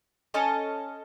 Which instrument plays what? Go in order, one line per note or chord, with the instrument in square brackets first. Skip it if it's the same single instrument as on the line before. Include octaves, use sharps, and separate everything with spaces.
[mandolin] C#4 A4 D#5 A5